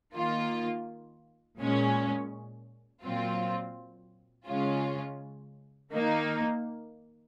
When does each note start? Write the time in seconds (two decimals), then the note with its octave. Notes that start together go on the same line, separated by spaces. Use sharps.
0.15 D#3 A#3 F4
1.59 A#2 G#3 C#4
3.04 A#2 F#3 C4 F4
4.47 C#3 G#3 C#4 F4
5.92 D#3 A#3 D#4